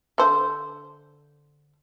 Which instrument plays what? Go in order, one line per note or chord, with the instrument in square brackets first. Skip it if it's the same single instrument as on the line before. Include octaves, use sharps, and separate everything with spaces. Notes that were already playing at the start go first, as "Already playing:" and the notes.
[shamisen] D3 C5